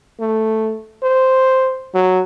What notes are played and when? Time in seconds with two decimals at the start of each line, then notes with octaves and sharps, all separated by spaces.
0.20 A3
1.03 C5
1.94 F#3